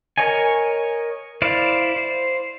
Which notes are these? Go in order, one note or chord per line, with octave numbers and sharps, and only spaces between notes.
A#4 C#5 D#5 G#5
E4 C5 D5 F5
C5